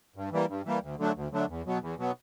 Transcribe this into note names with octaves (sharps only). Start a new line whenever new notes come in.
G2
E3 G3 A#3
G2
E3 G3 A#3
D2
D3 F#3 A3 D4
D2
D3 F#3 A3 D4
E2
B2 F#3 B3
E2
B2 F#3 B3